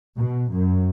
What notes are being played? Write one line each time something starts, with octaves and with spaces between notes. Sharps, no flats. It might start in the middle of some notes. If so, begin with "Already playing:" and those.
B2
F#2